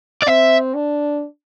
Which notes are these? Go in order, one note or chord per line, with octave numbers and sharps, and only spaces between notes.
D5
C4 E5
D4